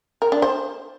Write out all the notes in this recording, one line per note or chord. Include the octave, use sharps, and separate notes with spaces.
A#4
D4
C5